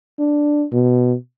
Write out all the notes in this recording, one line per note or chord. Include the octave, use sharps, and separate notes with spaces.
D4
B2